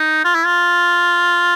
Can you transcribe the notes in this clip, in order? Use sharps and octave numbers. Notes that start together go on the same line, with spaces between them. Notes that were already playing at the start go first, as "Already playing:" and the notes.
Already playing: D#4
F4
E4
F4